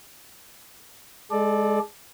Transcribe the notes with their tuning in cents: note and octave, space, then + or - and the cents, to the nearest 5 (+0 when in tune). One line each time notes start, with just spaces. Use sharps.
G#3 +0 A4 -30 D5 +10